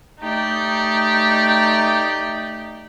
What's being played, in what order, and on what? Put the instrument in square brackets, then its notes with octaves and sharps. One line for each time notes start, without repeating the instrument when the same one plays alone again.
[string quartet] A3 D#4 G4 D5